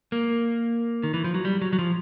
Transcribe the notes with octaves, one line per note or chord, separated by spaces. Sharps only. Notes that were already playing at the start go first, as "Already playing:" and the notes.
A#3
D#3
E3
F3
F#3
G3
F#3
F#3
F3